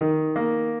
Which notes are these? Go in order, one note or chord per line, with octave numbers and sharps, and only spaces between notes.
D#3
A#3